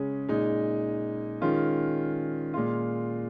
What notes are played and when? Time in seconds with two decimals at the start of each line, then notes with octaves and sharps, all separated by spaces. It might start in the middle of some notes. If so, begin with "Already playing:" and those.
Already playing: C#3 G#3 C#4
0.29 A#2 G#3 D#4
1.41 D#3 G#3 C#4 F4
2.54 A#2 G#3 F4